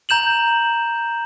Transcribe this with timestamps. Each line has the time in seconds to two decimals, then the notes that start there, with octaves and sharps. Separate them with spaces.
0.09 A#5 G6 E7 F#7